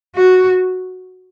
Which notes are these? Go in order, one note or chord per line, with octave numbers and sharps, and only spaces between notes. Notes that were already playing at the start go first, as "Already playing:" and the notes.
F#4